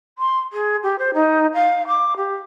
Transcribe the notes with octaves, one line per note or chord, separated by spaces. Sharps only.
C6
G#4
G4
C5
D#4
F5
D6
G4